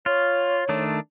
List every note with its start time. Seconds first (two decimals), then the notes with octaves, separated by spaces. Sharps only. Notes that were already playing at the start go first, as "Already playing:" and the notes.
0.06 F4 C#5
0.69 D#3 A3 D4